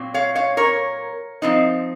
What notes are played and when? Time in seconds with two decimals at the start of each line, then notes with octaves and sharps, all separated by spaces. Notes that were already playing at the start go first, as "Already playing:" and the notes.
Already playing: A#2 F#3 C4
0.14 C#5 F5
0.35 C#5 F5
0.57 A#4 C#5
1.42 F3 C4 D#4